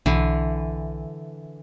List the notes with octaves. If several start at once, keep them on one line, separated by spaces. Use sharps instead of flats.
B1 D3 E3